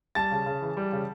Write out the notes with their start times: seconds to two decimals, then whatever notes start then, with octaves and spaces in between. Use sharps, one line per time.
0.15 G3 A5 A6
0.31 C#3
0.46 C#3
0.62 E3
0.77 G3
0.92 C#3